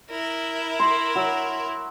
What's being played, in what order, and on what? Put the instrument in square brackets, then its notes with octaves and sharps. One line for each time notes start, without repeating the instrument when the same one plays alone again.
[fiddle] E4 A#4
[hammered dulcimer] C6
F#3